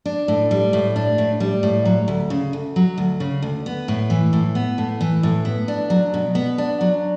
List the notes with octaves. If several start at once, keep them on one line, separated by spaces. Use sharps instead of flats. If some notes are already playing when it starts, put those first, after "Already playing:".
D4
A2
G3
A2
D4
A2
G3
A2
F#3
D2
C#3
D2
F#3
D2
C#3
D2
B3
A2
E3
A2
B3
A2
E3
A2
B3
D4
F#3
B2
B3
D4
F#3